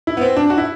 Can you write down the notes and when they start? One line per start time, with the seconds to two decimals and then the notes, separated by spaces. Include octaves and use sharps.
0.07 E4
0.17 B3
0.21 C4
0.37 D4
0.50 F#4
0.58 E4